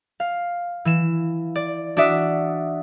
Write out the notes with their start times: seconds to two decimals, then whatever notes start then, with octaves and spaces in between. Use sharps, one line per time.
0.20 F5
0.85 E3 E7
1.55 D5
1.97 D4 F#4 D5 E5 D#6